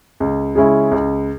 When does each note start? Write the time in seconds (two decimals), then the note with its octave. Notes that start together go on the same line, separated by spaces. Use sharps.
0.20 C#2
0.55 C#3 G#3 C#4 E4
0.91 C#2